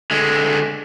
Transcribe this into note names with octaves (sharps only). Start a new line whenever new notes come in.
D3 G#3